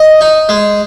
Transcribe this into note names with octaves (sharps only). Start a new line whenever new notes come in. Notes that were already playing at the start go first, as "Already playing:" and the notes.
Already playing: D#5
D#4
G#3